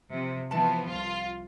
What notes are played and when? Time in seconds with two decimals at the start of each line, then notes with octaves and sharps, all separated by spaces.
0.11 C3 F3
0.51 E3 F3 B3 B4 A5
0.88 C2 F4